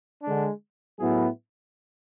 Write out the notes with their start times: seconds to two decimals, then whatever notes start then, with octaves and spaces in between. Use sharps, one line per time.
0.21 D3 G#3 D4
1.00 A2 F#3 B3 E4 G#4